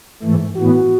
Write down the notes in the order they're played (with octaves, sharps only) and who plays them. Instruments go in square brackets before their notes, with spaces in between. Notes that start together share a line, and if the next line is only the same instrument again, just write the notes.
[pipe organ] G#2 E3 A3
[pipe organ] A2 E3 B3 [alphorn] F#4